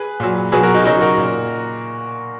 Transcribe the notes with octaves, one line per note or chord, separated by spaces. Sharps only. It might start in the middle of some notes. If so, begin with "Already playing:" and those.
Already playing: G#4 B4
A#2 F#3
B2 F#3 G#4 B4
F#4 A#4
D#4 F#4
C#3 F#3 D#4 F#4
F#4 A#4
A#2